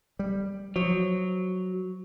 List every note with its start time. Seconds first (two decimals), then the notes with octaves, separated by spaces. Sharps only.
0.19 G3
0.76 F3 F#3